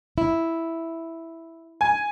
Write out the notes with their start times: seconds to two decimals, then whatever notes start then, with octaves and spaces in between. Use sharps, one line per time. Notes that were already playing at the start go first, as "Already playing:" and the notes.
0.18 E4
1.81 G#5